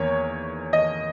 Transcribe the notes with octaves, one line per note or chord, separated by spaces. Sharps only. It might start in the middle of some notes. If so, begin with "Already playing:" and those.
Already playing: E2 D#3 A#3 C#5
D#5